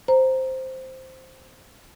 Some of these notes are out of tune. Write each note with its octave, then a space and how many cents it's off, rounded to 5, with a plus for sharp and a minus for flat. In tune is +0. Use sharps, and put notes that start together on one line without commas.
C5 +0 A#5 +0